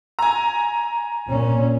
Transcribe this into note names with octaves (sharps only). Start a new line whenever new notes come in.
G#5 A#5
A#2 C#4